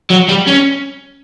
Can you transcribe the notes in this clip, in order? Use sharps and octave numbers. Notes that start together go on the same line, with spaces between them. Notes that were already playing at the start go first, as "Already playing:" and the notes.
F#3
G3
C#4